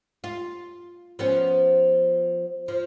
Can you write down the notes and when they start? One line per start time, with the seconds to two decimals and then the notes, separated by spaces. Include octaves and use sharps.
0.24 F4
1.19 F3 B3 C#4
2.68 F3